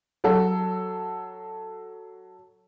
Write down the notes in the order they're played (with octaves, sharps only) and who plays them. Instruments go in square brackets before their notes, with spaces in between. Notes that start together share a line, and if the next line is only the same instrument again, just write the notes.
[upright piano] F#3 F#4 A4